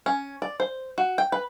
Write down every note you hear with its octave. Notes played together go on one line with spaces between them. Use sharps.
C#4
D5
C5
F#4
G5
B4